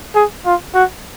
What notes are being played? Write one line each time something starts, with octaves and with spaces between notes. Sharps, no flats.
G#4
F4
F#4